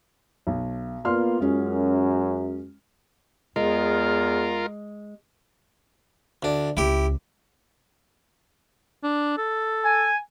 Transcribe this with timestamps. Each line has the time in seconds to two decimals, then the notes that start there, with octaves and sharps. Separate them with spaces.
0.47 B1
1.05 A#3 B3 F4 D5 C6 F6
1.41 F#2 G#3 C#4 F4
3.56 E2 G#3 F4 A#4
6.43 D2 D4
6.77 C#2 E4 G4
9.03 D4
9.38 A4
9.85 G#5